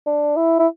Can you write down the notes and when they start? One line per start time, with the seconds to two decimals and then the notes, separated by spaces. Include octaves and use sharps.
0.06 D4
0.36 E4
0.59 E4